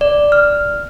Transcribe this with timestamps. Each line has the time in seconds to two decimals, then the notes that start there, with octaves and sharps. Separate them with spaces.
0.01 D5
0.32 F6